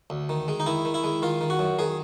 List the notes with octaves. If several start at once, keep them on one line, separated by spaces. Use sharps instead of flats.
D2
D#3
G#3
D#4
D#3 E4
D#3
E4
G#3
D#3 F4
D#3
F#4
F#2
D#3 G#4